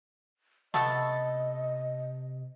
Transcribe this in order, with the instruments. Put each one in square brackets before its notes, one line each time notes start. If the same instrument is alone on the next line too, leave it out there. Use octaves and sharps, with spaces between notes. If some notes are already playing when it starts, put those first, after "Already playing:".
[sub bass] C3 [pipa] A3 B3 A4 [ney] D#5